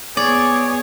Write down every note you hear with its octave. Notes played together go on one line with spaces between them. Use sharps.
B3 G#4 C#5 D5